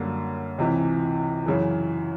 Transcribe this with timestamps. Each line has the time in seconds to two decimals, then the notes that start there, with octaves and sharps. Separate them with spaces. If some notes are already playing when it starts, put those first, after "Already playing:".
Already playing: F#2 D3 G3 A#3
0.58 C#2 C3 E3
1.46 F#2 C#3 E3